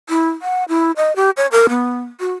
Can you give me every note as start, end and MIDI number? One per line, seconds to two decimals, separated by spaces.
0.09 0.29 64
0.42 0.64 78
0.69 0.92 64
0.97 1.15 75
1.16 1.30 67
1.37 1.47 73
1.52 1.67 70
1.69 2.01 59
2.20 2.31 66